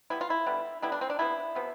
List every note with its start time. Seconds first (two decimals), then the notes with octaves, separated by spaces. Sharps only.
0.10 E3 G3 B3 E4
0.21 F4
0.30 E4
0.47 D3 G3 B3
0.82 D3 G3 B3 E4
0.92 D4
1.01 C4
1.10 D4
1.19 C3 F3 B3 E4
1.55 C3 F3 B3